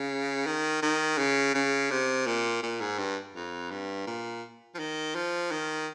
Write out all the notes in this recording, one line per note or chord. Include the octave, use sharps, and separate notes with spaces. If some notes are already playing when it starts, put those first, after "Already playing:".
Already playing: C#3
D#3
D#3
C#3
C#3
C3
A#2
A#2
G#2
G2
F2
G2
A#2
F3
D#3
F3
D#3